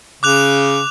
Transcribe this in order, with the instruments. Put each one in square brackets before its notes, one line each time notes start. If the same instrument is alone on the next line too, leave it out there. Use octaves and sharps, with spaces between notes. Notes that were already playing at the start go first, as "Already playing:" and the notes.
[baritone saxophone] C#3 [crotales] D6 F#6 F7